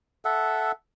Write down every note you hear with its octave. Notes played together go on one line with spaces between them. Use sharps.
A4 E5 F#5